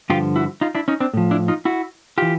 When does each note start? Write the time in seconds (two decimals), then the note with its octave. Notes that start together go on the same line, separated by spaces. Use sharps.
0.10 G2 D3 F3 F4 G4
0.36 E4 F#4
0.61 D#4 F4
0.75 D4 E4
0.88 C#4 D#4
1.00 C4 D4
1.14 A2 F3
1.31 D4 E4
1.48 D#4 F4
1.65 E4 F#4
2.18 E3 F4 G4